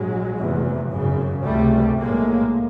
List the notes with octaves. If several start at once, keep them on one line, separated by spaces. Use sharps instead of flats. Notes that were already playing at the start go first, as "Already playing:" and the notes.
Already playing: A#1 G#2 F#3 G#3
F1 E2 C3
G#1 F#2 C#3
C#2 C3 G3 A3
B1 A2 G#3 A#3